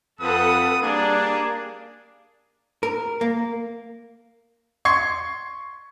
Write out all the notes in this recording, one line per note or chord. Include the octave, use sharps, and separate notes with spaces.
F2 A4 B4 F#5 D#6
G3 A#3 D4 G#4
A#4
A#3
C6 C#6 G#6 C7